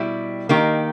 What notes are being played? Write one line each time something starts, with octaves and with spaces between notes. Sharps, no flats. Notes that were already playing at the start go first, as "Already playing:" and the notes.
Already playing: B2 G3 E4
D#3 A#3 D#4 G4